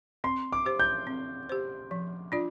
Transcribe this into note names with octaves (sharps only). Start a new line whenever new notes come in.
C4 C6
D6
G4 C5
G6
C4
G4 C5
F3
D4 F4 D5